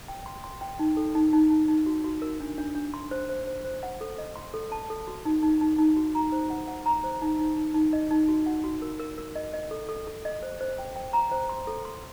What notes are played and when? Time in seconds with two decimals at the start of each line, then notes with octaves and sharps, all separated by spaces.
0.08 G5
0.26 C6
0.44 C6
0.61 G5
0.79 D#4
0.97 A4
1.15 D#4
1.33 D#4
1.50 D#4
1.68 D#4
1.86 F#4
2.04 F#4
2.22 A#4
2.40 D4
2.58 D4
2.75 D4
2.94 C6
3.11 C5
3.29 C5
3.47 C5
3.65 C5
3.83 F#5
4.01 A4
4.18 D#5
4.36 C6
4.54 A4
4.72 A5
4.90 A4
5.07 F#4
5.25 D#4
5.43 D#4
5.61 D#4
5.79 D#4
5.96 F#4
6.15 A#5
6.32 C5
6.50 F#5
6.68 F#5
6.86 A#5
7.04 C5
7.22 D#4
7.39 D#4
7.57 D#4
7.74 D#4
7.93 D#5
8.11 D#4
8.29 F#4
8.46 F#5
8.64 F#4
8.82 A#4
9.00 A#4
9.18 A#4
9.35 D#5
9.53 D#5
9.71 A4
9.89 A4
10.07 A4
10.25 D#5
10.43 C5
10.61 C5
10.78 G5
10.96 G5
11.13 A#5
11.32 C5
11.49 C6
11.67 A4
11.85 C6